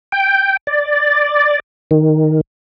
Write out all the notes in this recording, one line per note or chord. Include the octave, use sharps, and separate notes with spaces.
G5
D5
D#3